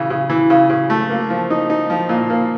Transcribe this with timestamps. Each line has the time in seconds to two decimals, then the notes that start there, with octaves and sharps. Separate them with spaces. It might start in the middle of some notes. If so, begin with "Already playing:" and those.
Already playing: C#3 E3
0.10 C#3
0.30 E3
0.50 C#3
0.70 C#3
0.90 A3
1.10 A#3
1.30 F3
1.50 D#4
1.70 D#4
1.90 F3
2.09 A#2
2.30 A#3